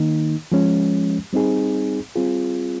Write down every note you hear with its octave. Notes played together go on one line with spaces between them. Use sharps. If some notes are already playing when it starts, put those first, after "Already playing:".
Already playing: D#3 A#3 D#4
F3 G#3 C#4
G3 C4 D#4 G#4
G3 C4 F4 G#4